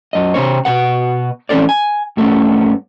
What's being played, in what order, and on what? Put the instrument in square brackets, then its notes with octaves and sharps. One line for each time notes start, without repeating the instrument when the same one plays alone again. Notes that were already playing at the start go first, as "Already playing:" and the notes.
[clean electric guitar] F#2 D#5
C3 C4 C#5
B2 B4 F#5
A2 E3 C4 C#4 A4 D5
G#5
G2 A3 B3 C#4